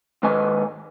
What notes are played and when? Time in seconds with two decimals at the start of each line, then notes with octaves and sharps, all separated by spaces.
0.23 G#2 D#3 B4 D#5 G#5